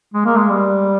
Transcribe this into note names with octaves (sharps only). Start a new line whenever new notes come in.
G#3
A#3
G#3
G3